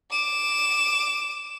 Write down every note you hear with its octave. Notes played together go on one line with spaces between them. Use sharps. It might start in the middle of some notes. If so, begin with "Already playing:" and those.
D6 E7